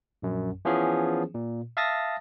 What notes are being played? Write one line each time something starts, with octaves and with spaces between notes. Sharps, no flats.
A#1 F#2
E3 F3 B3 C#4 G#4
A#2
E5 F5 A5 D#6 A6 A#6